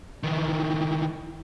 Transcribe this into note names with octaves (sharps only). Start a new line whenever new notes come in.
D#3 E3